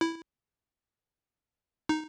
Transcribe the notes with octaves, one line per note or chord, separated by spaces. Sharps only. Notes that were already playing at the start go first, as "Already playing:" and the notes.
E4
D#4